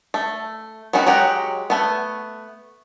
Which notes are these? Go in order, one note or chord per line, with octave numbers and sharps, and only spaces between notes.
A3
D#3 B3 C#4 D#4 F#4
F#3 G#3 G4 F#5 A#5
A3 B3